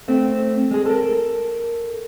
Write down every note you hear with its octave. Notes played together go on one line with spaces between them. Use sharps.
A3 C4
G#3 G#4
A4 A#4